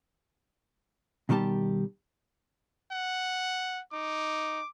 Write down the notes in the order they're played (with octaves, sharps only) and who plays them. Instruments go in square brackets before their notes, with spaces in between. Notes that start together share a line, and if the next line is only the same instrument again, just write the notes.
[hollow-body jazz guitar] B2 D#3 G3 G4 A5
[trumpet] F#5
[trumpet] D#4 [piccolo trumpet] D6